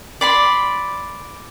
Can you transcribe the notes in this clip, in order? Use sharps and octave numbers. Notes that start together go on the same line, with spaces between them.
D5 B5 C6